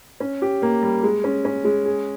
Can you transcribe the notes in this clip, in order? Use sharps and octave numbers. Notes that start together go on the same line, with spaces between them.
C#4
G4
A#3
G3
G#3
C#4
C#4
G#3
G#4